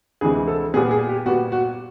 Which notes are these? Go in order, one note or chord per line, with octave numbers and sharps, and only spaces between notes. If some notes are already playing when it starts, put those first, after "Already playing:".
D2 C3 E3 G#3 G#4
A4
A#2 G3 B3 G#4
G#4
G4
A#2 G3 B3 F#4
F#4